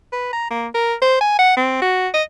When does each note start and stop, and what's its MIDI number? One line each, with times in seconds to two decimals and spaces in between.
0.13 0.33 71
0.33 0.49 82
0.50 0.68 58
0.74 0.94 70
1.02 1.20 72
1.21 1.35 80
1.39 1.56 78
1.57 1.81 60
1.82 2.09 66
2.14 2.23 75